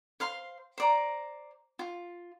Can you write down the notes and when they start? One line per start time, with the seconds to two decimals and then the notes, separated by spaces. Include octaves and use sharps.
0.20 C5 F5 C6
0.78 C5 D5 A#5
1.79 F4